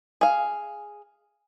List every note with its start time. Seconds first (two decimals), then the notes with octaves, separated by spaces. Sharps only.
0.21 G#4 F5